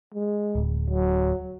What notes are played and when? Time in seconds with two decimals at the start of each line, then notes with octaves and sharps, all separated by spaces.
0.14 G#3
0.55 D1
0.90 F#3